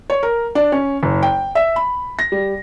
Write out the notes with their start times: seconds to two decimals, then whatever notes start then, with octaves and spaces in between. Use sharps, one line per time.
0.10 C#5
0.23 A#4
0.55 D4
0.72 C#4
1.03 F#1
1.23 G5
1.55 E5
1.76 B5
2.19 A#6
2.32 G3